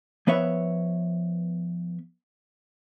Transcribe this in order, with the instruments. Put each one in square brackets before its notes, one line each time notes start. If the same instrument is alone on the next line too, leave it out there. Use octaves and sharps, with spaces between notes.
[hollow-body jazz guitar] F3 B3 B4 C#5 E5